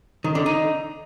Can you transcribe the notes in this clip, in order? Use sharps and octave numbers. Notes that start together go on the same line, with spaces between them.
D#3
D3
D#4